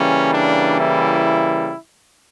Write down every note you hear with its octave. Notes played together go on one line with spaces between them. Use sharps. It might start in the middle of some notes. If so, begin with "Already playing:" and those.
Already playing: C#3 E3 G3 A#3 C#4
D4
E4